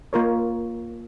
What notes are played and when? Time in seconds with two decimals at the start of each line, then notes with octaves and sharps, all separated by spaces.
0.13 A#3 F4 A#4 C#5